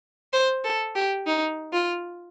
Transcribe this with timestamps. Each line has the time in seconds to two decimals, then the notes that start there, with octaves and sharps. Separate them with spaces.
0.33 C5
0.64 A4
0.95 G4
1.26 D#4
1.73 F4